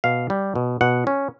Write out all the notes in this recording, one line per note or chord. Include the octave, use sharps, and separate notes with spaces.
B2 F5
G3
B2
B2 F#5
C#4